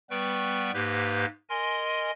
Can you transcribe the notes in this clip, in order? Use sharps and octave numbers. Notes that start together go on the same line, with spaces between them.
G3 B3 B4 G5 C#6
G#2 A#3 G4 B4 G6
A#4 D#5 G#5 C6